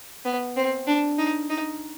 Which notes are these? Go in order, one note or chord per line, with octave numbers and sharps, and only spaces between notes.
B3
C4
D4
D#4
D#4